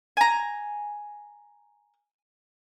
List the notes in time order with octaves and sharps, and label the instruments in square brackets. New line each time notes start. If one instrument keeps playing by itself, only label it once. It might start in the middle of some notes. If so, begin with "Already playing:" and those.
[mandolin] G#5 A#5